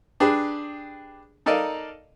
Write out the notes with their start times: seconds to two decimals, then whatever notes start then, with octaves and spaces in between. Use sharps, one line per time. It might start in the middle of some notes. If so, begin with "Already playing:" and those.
0.20 D4 G4 G#4 B4
1.46 D#4 A4 A#4 D5 D#5 F5